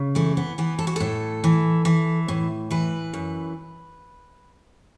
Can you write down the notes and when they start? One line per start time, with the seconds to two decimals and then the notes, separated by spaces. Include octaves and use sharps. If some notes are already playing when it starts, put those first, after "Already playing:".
Already playing: C#3
0.15 E3 A3
0.37 B3
0.58 E3 B3
0.79 A4
0.87 F#4
0.96 A2 A4
1.44 E3
1.85 E3
2.28 A2
2.71 E3 B4
3.14 F#2